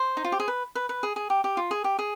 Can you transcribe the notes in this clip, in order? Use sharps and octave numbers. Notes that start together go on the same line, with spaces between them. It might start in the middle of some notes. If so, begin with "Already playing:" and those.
Already playing: C5
D#4
F4
G4
G#4
B4
B4
B4
G#4
G#4
G4
G4
F4
G#4
G4
G#4